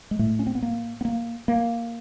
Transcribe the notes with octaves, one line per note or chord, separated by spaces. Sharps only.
G#3
A2 A3
C#4
C4
B3
A#3
B3
A#3
A#3